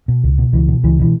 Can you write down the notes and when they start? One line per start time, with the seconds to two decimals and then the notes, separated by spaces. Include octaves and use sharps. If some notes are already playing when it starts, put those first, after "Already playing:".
0.08 B2
0.24 C#2
0.38 B2
0.53 C#2 E3
0.68 B2
0.83 C#2 E3
0.99 B2 E3